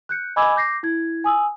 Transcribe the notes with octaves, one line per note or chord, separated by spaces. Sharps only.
F#6 G6 C#7
D#5 G#5 B5 D6 E6 G#6
D6 G6 A#6 C7
E4 G#6
G#5 D#6 E6